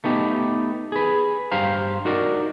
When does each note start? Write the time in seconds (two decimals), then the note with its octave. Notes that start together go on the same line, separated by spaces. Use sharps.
0.04 A3 B3 D#4 G4
0.92 G#4 B4
1.51 G2 G4 C5 F5 A#5
2.05 D#4 F#4 A#4 D5